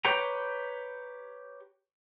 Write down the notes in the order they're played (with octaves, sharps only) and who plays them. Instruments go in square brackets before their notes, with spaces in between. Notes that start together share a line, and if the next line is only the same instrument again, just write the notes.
[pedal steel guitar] G4 B4 C#5 G5 A#5